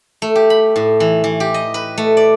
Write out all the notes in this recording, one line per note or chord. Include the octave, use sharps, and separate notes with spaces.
A3
G4
B5
A2
E3
E3
G4
D#5
B4
A3
D5